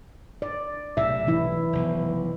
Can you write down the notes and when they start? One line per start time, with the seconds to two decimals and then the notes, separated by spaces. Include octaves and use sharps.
0.42 D5
0.97 B1 A2 C3 E5
1.27 E3 E4
1.73 F1 B1